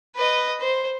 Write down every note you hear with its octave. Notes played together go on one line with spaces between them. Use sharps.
B4 D#5
C5